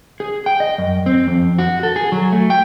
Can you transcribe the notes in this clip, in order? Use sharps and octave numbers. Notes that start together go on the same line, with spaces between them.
G#4
G5
D#5
F#2
C4
F2
F#4
A4
G#4
F#3
A3
G5